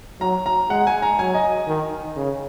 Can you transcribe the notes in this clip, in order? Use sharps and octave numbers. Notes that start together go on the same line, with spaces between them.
F#3 A#5
A#5
G#3 F#5
G#5
A#5
F#3 G#5
D#5
D#3
C#3